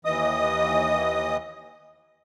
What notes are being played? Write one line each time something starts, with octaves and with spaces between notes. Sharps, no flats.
D#2 E3 D#5 D#6